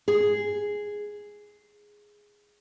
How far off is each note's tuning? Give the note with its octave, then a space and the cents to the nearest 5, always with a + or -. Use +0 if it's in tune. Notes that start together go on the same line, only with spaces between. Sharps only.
G#4 +0